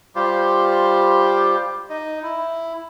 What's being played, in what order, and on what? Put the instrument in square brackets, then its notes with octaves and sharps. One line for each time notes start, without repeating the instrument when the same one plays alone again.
[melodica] G3 F4 G4 C5
D#4 D#5
E4